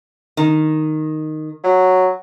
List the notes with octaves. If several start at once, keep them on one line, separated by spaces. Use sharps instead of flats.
D#3
F#3